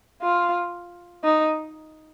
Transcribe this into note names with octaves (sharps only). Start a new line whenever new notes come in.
F4
D#4